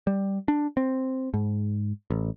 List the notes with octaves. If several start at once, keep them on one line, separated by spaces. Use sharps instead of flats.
G3
D4
C4
G#2
A1